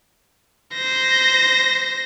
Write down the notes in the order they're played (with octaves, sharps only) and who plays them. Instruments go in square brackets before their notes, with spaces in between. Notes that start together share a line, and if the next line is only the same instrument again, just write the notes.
[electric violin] C5 A#6